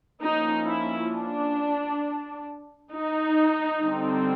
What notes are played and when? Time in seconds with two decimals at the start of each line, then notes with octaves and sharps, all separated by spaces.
0.22 F3 A#3 C#4 D#4
0.67 E4
1.12 D4
2.93 D#4
3.83 D3 G3 C4